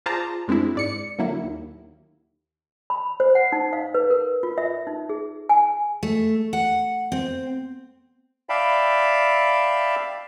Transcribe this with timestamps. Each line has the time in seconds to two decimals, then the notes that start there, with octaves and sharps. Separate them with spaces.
0.06 F4 G#4 C5 D5 A5 A#5
0.48 F#2 G#3 C4 D4 E4
0.75 G#2 D5 C#7
1.18 A#2 D3 F#3 A#3 E4
1.43 D#2
2.90 B5
3.20 C5
3.35 F#5
3.52 D#4
3.73 F5
3.94 B4
4.10 A#4
4.43 F4
4.58 E5
4.87 D#4
5.09 G#4
5.49 G#5
6.03 A3
6.53 F#5
7.12 C4
8.49 D5 E5 F5 G5 A5 B5